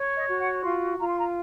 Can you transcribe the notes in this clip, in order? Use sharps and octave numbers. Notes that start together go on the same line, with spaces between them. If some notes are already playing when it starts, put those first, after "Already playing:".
Already playing: C#5
D#5
F#4
F#5
F4 C6
F4 A#5
C6
A#5